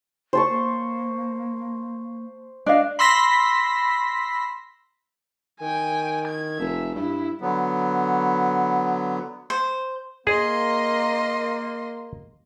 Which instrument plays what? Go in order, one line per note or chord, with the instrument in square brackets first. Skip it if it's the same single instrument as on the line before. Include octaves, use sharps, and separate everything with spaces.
[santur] C5 A5 C#6
[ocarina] A#3
[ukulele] D4 F5 [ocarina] D#5
[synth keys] B5 C6 E6 A#6 B6
[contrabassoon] D#3 [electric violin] G5 G#5
[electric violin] G#6
[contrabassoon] F1 [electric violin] E5
[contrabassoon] G2 [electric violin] E4
[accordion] D3 F#3 B3
[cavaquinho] C5
[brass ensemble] A#3 [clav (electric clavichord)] G#4 [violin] D#5 C6